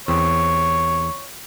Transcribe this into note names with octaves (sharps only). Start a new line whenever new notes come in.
E2 C4 C#5